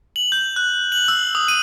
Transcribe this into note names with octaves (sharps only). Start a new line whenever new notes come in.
F#7
G6
F#6
F#7
E6
D#6
D#7